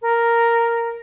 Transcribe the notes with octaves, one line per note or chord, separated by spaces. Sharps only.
A#4